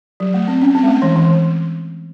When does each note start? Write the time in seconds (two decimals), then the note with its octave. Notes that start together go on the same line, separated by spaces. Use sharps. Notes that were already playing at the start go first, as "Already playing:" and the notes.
0.20 F#3
0.34 A3
0.48 C4
0.62 C#4
0.75 C4
0.83 G#3
0.88 A3
1.02 E3
1.16 E3